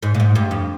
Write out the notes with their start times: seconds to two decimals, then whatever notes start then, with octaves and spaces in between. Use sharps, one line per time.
0.03 G#2
0.14 A#2
0.20 G#2
0.35 G2
0.51 F2